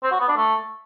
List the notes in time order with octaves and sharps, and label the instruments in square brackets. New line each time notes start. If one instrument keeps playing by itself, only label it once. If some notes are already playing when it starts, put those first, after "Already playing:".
[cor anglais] C4
F#4
B3
D4
A3